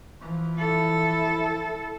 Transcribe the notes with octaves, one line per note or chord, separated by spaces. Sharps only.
E3 F3
E4 A4